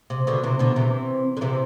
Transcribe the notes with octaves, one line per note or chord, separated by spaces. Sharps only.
C3
B2 D3
C3 E3
B2 D3
C3 E3
D3
C3 E3